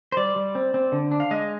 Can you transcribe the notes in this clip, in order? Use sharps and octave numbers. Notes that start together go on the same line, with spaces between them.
C5
G3 D5
G3
C4
C4
D3
D4
F5
G#3 D#5